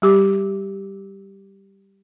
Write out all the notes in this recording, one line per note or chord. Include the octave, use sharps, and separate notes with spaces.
G3 G4 D6